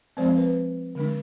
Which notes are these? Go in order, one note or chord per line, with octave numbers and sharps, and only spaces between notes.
F3 G#3 C4 C5
B4
D3 G#3 D4